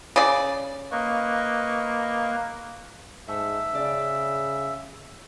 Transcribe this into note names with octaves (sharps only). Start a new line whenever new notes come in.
C#3 D5
A#3 B4 D#5 C#6
G#2 A3 E5
C#3 D5